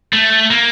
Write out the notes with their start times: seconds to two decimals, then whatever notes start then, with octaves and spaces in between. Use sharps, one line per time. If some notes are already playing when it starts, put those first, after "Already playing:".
0.13 A3
0.51 A#3